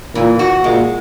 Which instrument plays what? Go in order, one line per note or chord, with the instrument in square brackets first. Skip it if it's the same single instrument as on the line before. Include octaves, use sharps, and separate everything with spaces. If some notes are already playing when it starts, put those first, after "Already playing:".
[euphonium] A#2 [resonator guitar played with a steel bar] E3
[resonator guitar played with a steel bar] F#4
[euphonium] A#2 [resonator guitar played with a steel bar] G#3